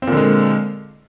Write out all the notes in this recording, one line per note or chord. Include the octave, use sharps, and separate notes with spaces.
A#2 D3 G#3 C4